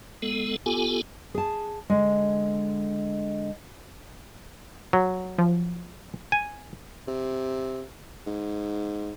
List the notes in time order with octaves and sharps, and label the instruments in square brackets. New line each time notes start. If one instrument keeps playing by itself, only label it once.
[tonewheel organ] G#3 B3 A4
B3 F4 G4 A4 G#5
[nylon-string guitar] G#4 A5
D3 G#3
[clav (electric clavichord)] F#3
[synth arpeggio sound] F3
[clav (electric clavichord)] G#5
[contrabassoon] C3
G#2